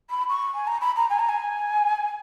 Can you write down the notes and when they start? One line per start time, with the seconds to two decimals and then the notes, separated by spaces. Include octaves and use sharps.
0.10 B5
0.29 C#6
0.55 G#5
0.67 A#5
0.81 B5
0.96 A#5
1.10 G#5
1.19 A#5
1.29 G#5